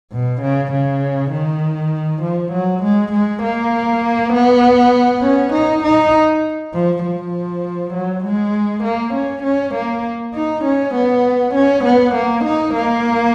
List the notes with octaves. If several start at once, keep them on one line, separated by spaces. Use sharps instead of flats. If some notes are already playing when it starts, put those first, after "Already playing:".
B2
C#3
C#3
D#3
F3
F#3
G#3
G#3
A#3
B3
C#4
D#4
D#4
F3
F3
F#3
G#3
A#3
C#4
C#4
A#3
D#4
C#4
B3
C#4
B3
A#3
D#4
A#3